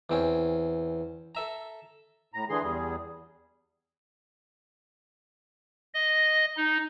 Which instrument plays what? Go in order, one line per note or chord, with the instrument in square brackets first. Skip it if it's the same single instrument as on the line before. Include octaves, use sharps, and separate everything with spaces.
[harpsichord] E2 C4 C#4
A4 E5 A#5
[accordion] A2 A#5
D3 E3 G#4 C6
E2 G3 G#4
[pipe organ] D#5
D#4